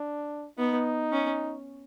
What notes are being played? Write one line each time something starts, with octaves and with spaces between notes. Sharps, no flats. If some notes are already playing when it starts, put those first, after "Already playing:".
Already playing: D4
B3 D#4
C#4